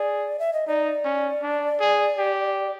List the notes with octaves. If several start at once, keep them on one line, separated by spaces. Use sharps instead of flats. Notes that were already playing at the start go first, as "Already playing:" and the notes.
Already playing: G#4 D5
E5
D#5
D#4 D5
C#4
D4
G#4
G4